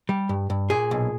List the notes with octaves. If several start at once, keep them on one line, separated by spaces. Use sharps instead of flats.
G3
G2
G2
A#2 G#4
B1